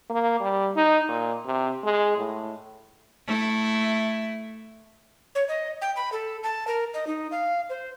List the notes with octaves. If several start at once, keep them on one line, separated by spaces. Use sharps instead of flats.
A#3
G3
D#4
A#2
C3
G#3
A2
A3 E4
C#5
D#5
G5
B5
A4
A5
A#4
D#5
D#4
F5
C5